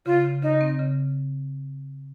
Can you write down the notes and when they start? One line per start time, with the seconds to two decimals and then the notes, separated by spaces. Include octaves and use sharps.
0.06 C#3 F4
0.24 C#3
0.42 C#3 D#4
0.61 C4
0.79 C#3